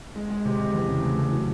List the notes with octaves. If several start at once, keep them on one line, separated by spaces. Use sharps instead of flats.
G#3
G#3
C3
C3
E2
C#3
A3
A3
F#3